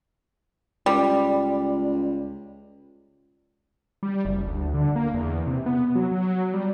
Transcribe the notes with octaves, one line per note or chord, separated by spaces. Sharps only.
C#2 G3
G3
F#1
D2
D3
A#3
E2
C3
B3
F#3
F#3
G3